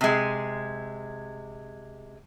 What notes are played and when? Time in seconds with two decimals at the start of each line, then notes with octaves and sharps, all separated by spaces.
0.01 C3 G#3